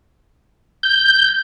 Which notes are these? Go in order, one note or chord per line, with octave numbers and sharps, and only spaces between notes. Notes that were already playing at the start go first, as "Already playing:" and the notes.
G6